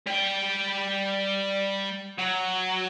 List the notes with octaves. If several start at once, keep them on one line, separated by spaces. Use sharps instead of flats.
G3 G5
F#3